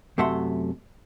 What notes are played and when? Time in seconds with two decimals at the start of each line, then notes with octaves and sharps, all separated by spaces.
0.18 F#2 C3 A3 E5 F#5 C6